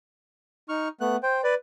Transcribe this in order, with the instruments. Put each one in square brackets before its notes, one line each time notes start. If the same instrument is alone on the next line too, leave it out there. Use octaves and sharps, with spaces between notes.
[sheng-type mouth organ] D#4 C#6 F6
A3 B3 F#6
C5 G5
B4 D5